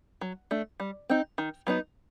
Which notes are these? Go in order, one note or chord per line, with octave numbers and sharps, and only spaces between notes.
F#3
A3 D4
G3
C4 D#4
D#3
F#3 B3 D#4